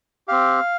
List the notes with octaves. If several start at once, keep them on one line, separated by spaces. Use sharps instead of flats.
C4 G4 F5